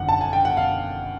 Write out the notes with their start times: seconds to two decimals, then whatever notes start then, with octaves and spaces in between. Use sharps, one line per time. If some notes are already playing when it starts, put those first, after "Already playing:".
Already playing: G1 F#2 D#3 F#5
0.09 A5
0.21 G#5
0.33 G5
0.45 F#5
0.57 F5